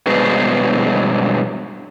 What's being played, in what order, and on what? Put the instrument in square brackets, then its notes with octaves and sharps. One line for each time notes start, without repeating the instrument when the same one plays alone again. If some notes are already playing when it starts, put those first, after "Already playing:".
[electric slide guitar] G2 B2 F#3 G#3 B3 C5